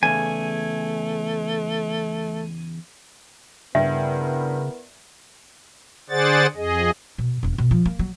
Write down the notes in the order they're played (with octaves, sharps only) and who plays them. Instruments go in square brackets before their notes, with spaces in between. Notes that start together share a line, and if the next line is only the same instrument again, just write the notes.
[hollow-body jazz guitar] E2 C#3 [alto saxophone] A3 [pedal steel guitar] G#5
[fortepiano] G2 [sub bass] C#3 [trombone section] B3 E4 A#4 [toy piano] E5
[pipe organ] D3 G#4 C5 D5 F#5 A6
F2 G#4 D#5
[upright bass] B2
E1 D4
B2
F3
A#3
F#3